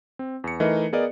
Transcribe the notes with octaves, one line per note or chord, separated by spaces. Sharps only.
C4
E2 C#7
E3 A3 D#4 A#4 D#5
B3 G#4 A#4 D5 D#5